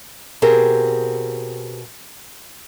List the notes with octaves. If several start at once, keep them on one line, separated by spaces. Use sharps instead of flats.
B2 C4 G4 G#4 A#4